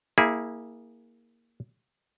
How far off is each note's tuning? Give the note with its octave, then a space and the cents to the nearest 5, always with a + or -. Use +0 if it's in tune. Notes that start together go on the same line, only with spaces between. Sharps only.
A#3 +0 E4 -20 G#4 -15